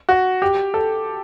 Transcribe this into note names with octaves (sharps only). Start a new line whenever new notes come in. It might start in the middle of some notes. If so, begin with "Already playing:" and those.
F#4
G4
A4